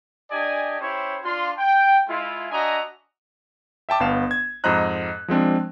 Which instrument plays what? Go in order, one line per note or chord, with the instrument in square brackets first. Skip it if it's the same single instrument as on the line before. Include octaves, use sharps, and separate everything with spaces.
[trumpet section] D4 G4 D5 D#5 G#5
C#4 E4 G4 C5 C#5
D4 F4 C6
G5
G#3 E4 F4
D4 F#4 D#5 E5 G#5 A#5
[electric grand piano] E5 G5 A5 D6
G1 B3 F5 E7
G#6
F2 G#2 C5 D#5 A#5 F#6
F3 G#3 C4 D4